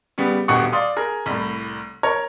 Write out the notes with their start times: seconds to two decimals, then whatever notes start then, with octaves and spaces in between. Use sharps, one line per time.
0.18 C#3 G3 B3
0.48 D#1 D2 B2 G4 F#5 C#6
0.73 D5 F5 C6 D#6
0.97 G#4 A#4
1.26 C2 A2
2.03 A#4 C#5